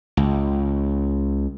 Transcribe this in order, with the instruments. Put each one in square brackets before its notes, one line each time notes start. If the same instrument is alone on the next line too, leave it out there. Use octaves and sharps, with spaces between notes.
[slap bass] C#2